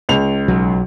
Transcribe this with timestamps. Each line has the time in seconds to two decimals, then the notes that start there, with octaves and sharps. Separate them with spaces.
0.09 C#2 F7
0.48 B1 F#3